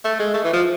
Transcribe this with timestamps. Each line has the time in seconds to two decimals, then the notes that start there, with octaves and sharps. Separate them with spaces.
0.04 A3
0.19 G#3
0.34 A3
0.44 E3
0.53 F3